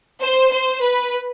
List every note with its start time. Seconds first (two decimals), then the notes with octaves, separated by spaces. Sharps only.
0.21 C5
0.51 C5
0.82 B4